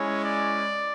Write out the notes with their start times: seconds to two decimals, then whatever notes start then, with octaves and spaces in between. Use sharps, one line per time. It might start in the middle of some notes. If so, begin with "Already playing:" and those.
Already playing: G#3 C#4 E4 C#5
0.24 D5